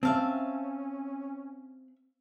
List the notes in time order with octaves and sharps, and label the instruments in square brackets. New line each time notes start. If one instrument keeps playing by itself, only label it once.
[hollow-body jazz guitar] C4 [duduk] C#4 [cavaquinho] E5 F5 A5